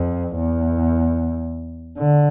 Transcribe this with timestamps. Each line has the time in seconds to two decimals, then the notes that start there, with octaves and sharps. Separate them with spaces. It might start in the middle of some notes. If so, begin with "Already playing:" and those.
Already playing: F2
0.36 E2
1.98 D3